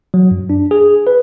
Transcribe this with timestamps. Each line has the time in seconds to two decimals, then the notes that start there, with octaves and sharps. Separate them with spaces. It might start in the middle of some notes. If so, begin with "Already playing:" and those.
0.14 F#3
0.31 F#2
0.50 D4
0.71 G#4
1.07 B4